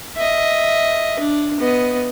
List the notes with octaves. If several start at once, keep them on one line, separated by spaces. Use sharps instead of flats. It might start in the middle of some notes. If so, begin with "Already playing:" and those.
D#5 E5
D4
B3 D#5